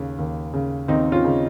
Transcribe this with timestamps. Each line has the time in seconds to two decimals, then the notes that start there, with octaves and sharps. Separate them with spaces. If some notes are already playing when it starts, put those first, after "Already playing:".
Already playing: D#2 C#3
0.19 D#2
0.53 C#3
0.88 D#2 C4 D#4
1.12 C#4 F4
1.24 C#3